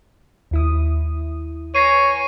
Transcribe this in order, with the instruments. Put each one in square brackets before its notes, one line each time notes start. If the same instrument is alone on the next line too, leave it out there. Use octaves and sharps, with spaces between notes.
[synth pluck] D#2 E4 D#6
[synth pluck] B4 G#5 [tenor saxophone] C#5 [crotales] A#6 C7 D#7